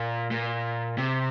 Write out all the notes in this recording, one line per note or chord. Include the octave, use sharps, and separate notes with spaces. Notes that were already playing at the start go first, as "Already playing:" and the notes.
Already playing: A#2
A#2
C3